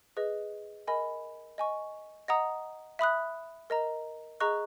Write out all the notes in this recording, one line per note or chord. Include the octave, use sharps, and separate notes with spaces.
G#4 B4 D#5
A#4 D#5 G#5 B5
D#5 G#5 C#6
D#5 F#5 A#5 D#6
E5 B5 D#6 F#6
A#4 D#5 A#5
G#4 D#5 A#5 C#6 F#6